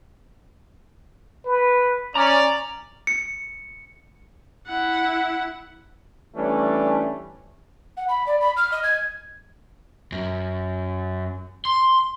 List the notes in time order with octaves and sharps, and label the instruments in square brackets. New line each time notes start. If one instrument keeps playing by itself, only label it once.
[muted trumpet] B4
[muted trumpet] C#4 [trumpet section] D5 [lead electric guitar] A#5
[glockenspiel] C#7
[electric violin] E4 F#5
[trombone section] E3 G3 A3 C#4 D4
[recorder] F#5
B5
D5
B5
F6
D#5
G#6
[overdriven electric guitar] F#2
C6